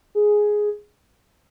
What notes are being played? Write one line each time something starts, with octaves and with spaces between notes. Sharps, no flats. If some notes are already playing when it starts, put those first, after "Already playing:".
G#4